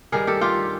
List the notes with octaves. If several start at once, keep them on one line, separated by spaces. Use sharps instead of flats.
G2 D#3 G3 G#4 A#4
G4 A4
F4 G4